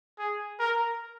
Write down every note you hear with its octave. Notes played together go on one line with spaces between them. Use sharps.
G#4
A#4